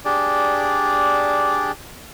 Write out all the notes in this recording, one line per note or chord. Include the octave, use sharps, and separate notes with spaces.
D4 G4 G#4 D5